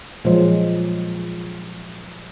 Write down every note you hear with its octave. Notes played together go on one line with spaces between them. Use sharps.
A#2 F3 F#3 G#3 C5